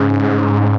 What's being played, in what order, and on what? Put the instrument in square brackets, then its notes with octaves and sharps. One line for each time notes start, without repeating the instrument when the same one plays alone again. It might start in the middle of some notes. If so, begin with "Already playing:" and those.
Already playing: [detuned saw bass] G#2 [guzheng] C#3 C#4